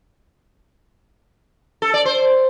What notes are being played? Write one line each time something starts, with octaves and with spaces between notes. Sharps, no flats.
A4
D5
C5